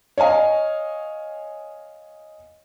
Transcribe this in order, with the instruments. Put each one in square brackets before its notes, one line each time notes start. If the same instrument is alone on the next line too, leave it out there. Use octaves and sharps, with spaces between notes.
[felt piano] C#5 D#5 F5 G#5